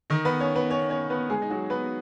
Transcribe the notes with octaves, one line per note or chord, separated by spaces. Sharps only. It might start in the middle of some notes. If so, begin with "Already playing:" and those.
D#3 D#4
B3 B4
C#4 C#5
B3 B4
C#4 C#5
C#4 C#5
B3 B4
G#3 G#4
D#4
F#3 F#4
B3 B4